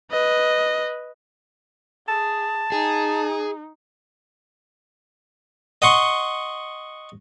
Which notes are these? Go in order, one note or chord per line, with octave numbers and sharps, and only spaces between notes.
B4 D#5
G#4 A5
D#4 G#4
D#5 F#5 C6 C#6